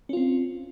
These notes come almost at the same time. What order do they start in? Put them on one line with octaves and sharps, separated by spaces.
C#4 F4 C4